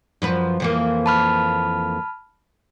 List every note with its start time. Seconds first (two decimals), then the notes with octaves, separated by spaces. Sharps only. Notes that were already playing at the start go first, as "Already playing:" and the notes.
0.22 F#2 F3 B4
0.60 F2 E3 A#3
1.06 A5 B5 F6